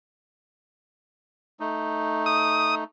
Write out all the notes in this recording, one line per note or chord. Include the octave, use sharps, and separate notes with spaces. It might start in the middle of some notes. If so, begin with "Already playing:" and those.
A3 D#4
D#6